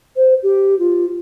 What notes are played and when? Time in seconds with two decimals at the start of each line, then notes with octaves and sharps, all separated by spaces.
0.16 C5
0.43 G4
0.79 F4